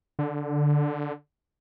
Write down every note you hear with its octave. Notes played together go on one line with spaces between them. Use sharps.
D3